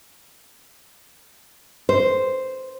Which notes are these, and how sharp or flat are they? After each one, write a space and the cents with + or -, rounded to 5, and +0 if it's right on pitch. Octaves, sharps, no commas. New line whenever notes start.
C5 -5